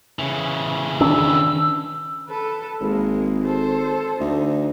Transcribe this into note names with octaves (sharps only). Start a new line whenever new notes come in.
C#3 E3
D#3 C#4 D4 E6
A4 B4
G#1 G#3 A#3
A4 C5
D2 D#4